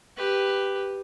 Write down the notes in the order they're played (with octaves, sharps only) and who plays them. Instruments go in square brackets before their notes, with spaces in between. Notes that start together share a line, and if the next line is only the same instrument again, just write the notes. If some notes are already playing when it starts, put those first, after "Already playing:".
[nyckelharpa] G4 B4